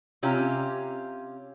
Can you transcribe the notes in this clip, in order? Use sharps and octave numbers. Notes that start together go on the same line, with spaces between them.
C3 C#4 F4 G4 F5 A#5